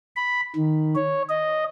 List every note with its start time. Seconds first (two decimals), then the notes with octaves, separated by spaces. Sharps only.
0.16 B5
0.56 D#3
0.95 C#5
1.30 D#5